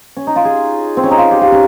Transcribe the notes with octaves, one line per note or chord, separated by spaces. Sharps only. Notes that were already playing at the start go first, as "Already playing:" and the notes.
C#4
D#4
F4
G#4
C4
C#4
D#4
F4
G4
F4
C#4